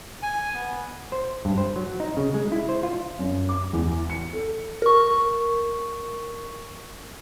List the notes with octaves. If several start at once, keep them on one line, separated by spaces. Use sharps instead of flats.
G#5
B3
C5
G2
C5
F#3
D#4
C#3
G#3
E4
C5
F4
F#2
D6
E2
C#7
A4
A#4 C#6